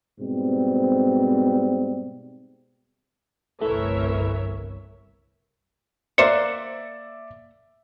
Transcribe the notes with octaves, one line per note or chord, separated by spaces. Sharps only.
G#2 B2 G3 C4
G1 C2 E3 A3 A#4 C#5 E5
A#3 C5 D5 E5 F#5 C#7